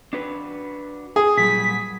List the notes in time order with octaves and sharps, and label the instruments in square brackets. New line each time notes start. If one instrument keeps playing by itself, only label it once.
[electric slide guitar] D4 F#4 B4
[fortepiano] G#4
[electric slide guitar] A#2 F#3 G3 [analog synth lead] B6